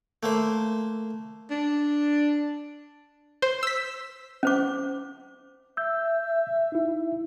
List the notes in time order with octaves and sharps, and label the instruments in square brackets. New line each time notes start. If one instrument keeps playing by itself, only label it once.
[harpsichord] A3 A#3 C5
[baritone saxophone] D4
[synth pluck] C5
E6 B6
[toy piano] C#4 C5 D6
[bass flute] E5 [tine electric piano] E6 G6
[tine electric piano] D#4 E4